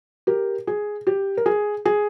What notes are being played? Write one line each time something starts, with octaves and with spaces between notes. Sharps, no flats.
G4 A#4
G#4
G4
A#4
G#4
G#4